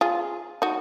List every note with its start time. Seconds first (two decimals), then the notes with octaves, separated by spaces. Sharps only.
0.01 F4 G#4
0.62 D#4 F#4